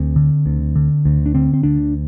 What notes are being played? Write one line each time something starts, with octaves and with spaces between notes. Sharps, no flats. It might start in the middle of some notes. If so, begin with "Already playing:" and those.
Already playing: D2 C4
D3
D2
D3
D2
D4
D3 C4
C4
D2 D4